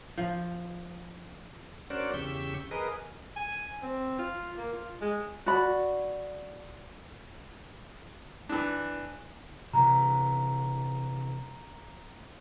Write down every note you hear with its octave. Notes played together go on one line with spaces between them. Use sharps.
F3
C#4 D4 F#4 A#4 C5 D5
E2 C#3 G4 C#6 E6 G6
G#4 A#4 B4 D#5
G#5
C4
F4
A#3
F4
G#3
F#4 D5 B5
E3 D4
C3 E3 A#5